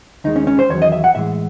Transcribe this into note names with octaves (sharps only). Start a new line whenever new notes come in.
D#2 D#3 G#3 D#4
C#4
C#4
C5
E2 D#3 F#3 C#5
D#5
E5
F#5
A2 E3 G#3 E5